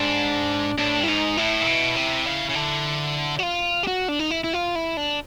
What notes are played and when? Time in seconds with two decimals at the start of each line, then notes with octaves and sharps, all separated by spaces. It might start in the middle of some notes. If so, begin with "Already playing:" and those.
Already playing: G#2 D4
0.78 A2 D4
1.00 G2
1.03 E4
1.08 G#2 D#4
1.37 A2 E4
1.61 A#2
1.66 B2
1.96 C3
2.25 C#3
2.49 C#3
2.55 D3
3.39 F#4
3.43 F4
3.83 G4
3.87 F#4
4.08 D4
4.19 D#4
4.30 E4
4.44 E4
4.53 F4
4.75 E4
4.97 D4